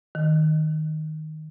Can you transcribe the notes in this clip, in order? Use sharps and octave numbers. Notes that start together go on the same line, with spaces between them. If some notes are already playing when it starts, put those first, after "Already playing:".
D#3